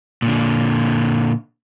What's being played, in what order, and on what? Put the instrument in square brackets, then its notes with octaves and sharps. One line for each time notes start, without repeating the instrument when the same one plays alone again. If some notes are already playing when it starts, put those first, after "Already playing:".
[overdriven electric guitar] A#2 D3